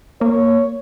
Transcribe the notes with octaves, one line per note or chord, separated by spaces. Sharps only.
A#3 C#5